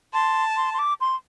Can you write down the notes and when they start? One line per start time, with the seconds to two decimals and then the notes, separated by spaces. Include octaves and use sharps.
0.13 A5 C6
0.56 C6
0.74 C6
0.79 D6
1.01 C6